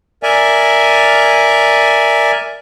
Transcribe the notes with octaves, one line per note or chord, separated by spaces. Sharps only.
A#4 D5 E5 G#5